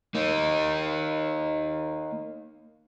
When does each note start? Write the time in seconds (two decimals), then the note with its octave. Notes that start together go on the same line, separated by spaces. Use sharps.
0.15 A#3 D#4